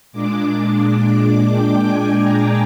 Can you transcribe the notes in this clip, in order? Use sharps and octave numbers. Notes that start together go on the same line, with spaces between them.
A#2 G#3 D4 D6
G5
G#5
A#5